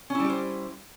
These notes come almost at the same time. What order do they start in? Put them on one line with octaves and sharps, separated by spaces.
C#4 E4 G3 G4 C5